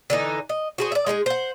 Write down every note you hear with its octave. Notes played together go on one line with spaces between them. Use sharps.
D3 E3 D#4
D#5
F#4 G#4 C5
D5 E5
G#3 D#4 G4 G#4
C5 F#5